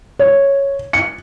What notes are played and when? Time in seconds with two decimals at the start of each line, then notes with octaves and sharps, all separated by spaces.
0.19 C#5
0.93 C#7